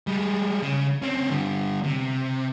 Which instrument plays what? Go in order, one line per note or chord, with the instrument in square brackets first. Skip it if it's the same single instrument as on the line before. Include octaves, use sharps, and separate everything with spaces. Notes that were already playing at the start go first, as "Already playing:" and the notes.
[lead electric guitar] G3 G#3
C#3
C4 C#4
D3 G3
C3